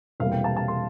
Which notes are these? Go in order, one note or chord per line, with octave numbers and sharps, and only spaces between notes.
E1 E2 C3 G3 A#3 F5
G5
A5
A5
C6